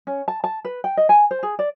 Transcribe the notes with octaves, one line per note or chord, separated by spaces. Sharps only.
C#4
A5
A5
B4
G5
D#5
G#5
C5
G#4
D5